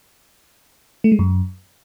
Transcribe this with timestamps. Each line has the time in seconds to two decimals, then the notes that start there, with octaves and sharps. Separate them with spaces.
1.04 A3
1.12 G#3
1.19 F#2